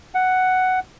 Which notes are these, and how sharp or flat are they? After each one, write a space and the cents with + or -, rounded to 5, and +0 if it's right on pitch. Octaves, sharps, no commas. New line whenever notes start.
F#5 +5